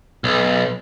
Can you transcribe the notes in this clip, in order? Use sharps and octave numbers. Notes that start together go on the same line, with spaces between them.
B1